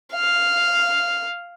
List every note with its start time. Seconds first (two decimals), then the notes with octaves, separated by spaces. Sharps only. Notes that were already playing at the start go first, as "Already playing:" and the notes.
0.13 F5